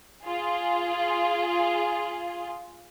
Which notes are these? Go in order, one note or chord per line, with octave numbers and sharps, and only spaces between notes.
F4 G#4